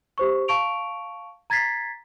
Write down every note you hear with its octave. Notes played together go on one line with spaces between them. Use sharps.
G4 C5 C#6
F5 A5 C#6 D7 F7
A#5 G#6 A6 B6 C7